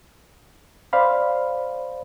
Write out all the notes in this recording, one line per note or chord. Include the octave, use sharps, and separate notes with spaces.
C5 D5 F5 B5